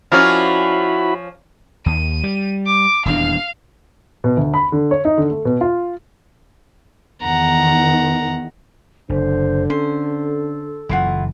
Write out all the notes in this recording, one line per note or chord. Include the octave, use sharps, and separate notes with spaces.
F3 C#4 E4 F#4 A#4 D5 G#5 B5
D#2 D#7
G3
D6
D#1 E2 D4 F5
B2
D2
B5
D3
C#5
D#4
D3
A3
B2
F4
E2 D#3 F#5 A#5
F#1 D3 C5
C#4 A4 C5
F#1 F#2 E3 E4 F4 F#5